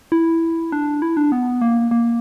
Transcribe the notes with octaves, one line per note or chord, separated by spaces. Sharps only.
E4
D4
E4
D4
B3
A#3
A#3